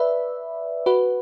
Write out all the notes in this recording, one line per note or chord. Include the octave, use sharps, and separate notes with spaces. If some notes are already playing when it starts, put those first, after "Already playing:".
Already playing: B4 D5 E5
F#4 B4